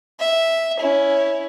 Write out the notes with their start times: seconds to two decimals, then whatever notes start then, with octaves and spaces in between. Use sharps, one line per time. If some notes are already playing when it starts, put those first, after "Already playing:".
0.19 E5
0.80 C#4 E4